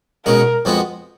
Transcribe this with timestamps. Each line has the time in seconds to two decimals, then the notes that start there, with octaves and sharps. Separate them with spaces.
0.26 B2 G#3 C#4 F#4 A#4
0.65 F2 F3 G#3 B3 F#4